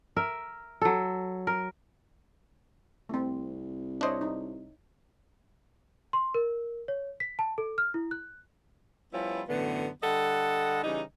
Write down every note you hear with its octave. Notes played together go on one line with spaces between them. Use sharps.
A#4 E5
F#3 A4
A#4
C2 A3 C4
D4 C5 C#5 D#5 E5
D#4
C6
A#4
C#5
B6
A5
A4
F6
E4
F#6
F3 G3 B3 C#4 E4 F4
F#2 A2 D3 E3 B3
D3 G3 A4 D#5 F#5
C#3 E3 G3 D#4